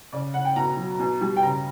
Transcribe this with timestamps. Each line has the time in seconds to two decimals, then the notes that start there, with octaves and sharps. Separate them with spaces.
0.13 C#3 D5
0.34 C#3 F#5
0.45 G5
0.56 B2 A#5
0.77 F#3
0.99 B2
1.21 G3
1.37 G5
1.43 C#3 A#5